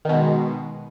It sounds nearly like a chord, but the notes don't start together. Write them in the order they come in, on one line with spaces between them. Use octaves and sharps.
D#3 B2 G#3